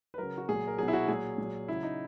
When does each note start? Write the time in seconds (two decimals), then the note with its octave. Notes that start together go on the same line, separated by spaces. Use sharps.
0.14 B4
0.18 C#3 F#3 A#4
0.38 F#4
0.49 A#2 F#3 G#4
0.68 A#4
0.78 B2 F#3 G#4
0.88 E4
0.93 F#4
1.08 A#2 F#3 G#4
1.38 A#2 F#3
1.68 C#3 F#3 E4
1.83 D#4